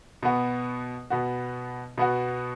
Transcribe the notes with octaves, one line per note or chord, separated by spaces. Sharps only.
B2 B3 F#4
B2 B3 F#4
B2 B3 F#4